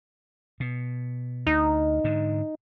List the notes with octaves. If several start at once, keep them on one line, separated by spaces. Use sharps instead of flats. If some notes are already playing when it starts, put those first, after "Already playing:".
B2
D2 D#4
G#2 D3